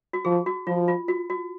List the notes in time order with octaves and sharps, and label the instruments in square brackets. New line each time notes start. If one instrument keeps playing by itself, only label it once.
[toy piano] F#4
[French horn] F3 [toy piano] G#4
[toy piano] F#4
[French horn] F3 [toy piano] F4
[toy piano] F4
F#4
F#4